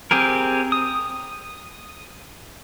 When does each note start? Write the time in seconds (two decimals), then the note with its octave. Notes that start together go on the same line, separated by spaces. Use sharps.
0.11 C4 G4 G#4 A#4
0.72 D#6